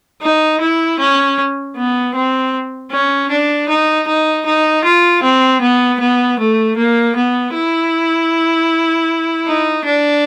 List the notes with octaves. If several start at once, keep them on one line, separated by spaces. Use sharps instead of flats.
D#4
E4
C#4
B3
C4
C#4
D4
D#4
D#4
D#4
F4
C4
B3
B3
A3
A#3
B3
E4
D#4
D4